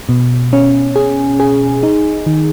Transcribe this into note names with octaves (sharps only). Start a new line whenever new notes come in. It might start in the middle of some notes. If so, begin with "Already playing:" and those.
B2
C#4
G#4
G#4
D#4
D#3